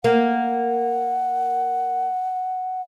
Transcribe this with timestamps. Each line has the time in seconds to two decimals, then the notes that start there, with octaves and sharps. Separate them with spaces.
0.04 A#3 F#5